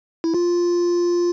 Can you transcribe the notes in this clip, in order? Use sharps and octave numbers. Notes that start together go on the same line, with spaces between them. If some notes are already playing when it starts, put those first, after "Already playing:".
E4
F4